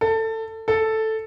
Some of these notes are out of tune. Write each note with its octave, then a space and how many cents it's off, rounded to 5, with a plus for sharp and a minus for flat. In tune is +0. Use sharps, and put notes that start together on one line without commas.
A4 +20
A4 +0